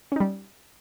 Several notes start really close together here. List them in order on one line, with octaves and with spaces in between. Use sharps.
C#4 D#4 G3